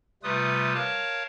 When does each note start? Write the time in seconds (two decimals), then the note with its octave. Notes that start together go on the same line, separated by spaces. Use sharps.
0.23 C3 G3 A3 F4 B4 D#6
0.74 A#4 C#5 F5 A5